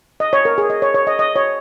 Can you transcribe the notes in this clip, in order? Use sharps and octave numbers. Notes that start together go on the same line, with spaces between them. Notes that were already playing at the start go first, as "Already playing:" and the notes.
D#5
C#5
A#4
G#4
D#5
C#5
C#5
D#5
D#5
C#5